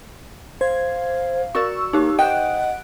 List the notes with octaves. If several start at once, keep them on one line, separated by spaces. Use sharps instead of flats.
C5 F5 G#6
F#4 A#4 D5 C#6 E6
A#3 D#4 G4
C5 D#5 F#5 G5 F#6 D7